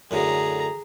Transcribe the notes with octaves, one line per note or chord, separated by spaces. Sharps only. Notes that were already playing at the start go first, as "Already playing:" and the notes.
F#2 A2 D3 G#4 A#5